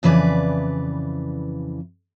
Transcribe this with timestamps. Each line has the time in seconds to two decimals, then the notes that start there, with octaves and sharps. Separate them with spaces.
0.03 F2 C#3 E3 B4 D5